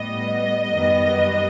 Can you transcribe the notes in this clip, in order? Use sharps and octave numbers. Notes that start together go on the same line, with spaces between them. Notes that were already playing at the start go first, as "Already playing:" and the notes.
Already playing: A2 G3 B3 D#5
F#2 D#3 G3 B3